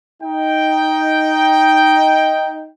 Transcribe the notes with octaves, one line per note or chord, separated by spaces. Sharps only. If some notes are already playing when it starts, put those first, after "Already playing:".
D#4 G5